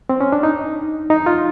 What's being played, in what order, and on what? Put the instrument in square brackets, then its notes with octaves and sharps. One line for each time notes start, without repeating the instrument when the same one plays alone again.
[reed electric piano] C4
C#4
D4
D#4
D#4
F4